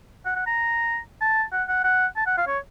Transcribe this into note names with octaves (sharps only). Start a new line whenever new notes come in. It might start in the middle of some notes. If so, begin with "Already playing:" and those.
F#5
F#5
A#5
A5
F#5
F#5
F#5
A5
F#5
F5
C#5